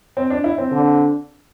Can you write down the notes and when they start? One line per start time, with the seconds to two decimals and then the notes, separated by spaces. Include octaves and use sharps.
0.17 C4
0.30 D4
0.44 E4
0.58 C4
0.71 D3